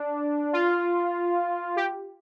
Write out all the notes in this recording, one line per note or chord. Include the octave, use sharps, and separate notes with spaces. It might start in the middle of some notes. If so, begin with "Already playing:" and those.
Already playing: D4
F4
G4